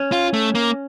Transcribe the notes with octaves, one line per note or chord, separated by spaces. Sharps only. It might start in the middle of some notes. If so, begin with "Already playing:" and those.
Already playing: C#4
F4
A3
A#3